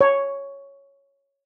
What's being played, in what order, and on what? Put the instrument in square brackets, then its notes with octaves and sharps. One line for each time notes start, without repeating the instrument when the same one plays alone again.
[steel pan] C#5